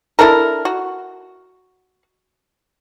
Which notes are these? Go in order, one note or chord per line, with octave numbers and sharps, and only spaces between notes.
D4 E4 A4 A#4
F#4